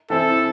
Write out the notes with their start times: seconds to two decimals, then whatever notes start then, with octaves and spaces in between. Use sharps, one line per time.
0.10 E3 C4 E4 A4